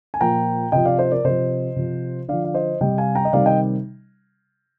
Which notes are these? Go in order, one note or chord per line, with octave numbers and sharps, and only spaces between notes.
G#5
A#2 F3 G5 A#5
C3 F3 D#5 G5
D5 F5
C5 D#5
A#4 D5
C3 F3 C5 D#5
C3 F3
D3 F3 D5 F5
F5
C5 D#5
C3 G3 D#5 G5
F5 G#5
G5 A#5
D#5
C3 D#3 G3 D5 F5
D#5 G5